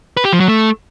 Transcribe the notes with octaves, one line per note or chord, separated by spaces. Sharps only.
B4
G4
F3
F#3
A3